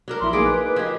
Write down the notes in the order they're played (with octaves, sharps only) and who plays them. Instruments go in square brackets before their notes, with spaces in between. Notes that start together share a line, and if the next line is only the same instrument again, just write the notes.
[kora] F#3 D4 A#4
[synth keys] A#1 E4 B5 [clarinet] C6
[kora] A#3 G#4 [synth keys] D#4 [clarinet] D6
[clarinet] B4
B4
[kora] F3 G4 [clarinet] B4 [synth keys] D#5 G#6